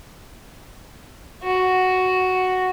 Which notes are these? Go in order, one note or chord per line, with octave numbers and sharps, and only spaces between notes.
F#4